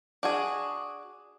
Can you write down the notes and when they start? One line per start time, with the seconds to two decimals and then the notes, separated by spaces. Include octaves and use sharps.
0.23 D4 F#4 G#4